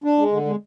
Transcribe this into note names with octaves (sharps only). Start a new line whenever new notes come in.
D4
G#3
D3
G#3